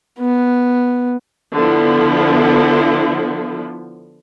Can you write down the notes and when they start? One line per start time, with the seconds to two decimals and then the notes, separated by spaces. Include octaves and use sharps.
0.19 B3
1.54 D3 F3 B3 E4